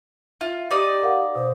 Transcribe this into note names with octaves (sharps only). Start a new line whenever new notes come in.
F4 E5
D#4 G4 D5 D#6
A#4 F5 F#5
B2 C5